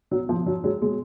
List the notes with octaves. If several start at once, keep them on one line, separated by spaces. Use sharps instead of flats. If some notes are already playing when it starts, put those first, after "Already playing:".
B2 F#3
F3
F#3
F#3 G#3
B2 F#3 G#3